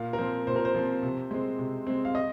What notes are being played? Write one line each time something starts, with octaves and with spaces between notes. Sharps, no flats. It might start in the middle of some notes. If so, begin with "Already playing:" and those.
Already playing: A#2 F5
A#4
F3 C4 C5
A#2 C5
A#4
C5
F3 C4
C3
G#3 C4
C3
G#3 C4
F5
D#5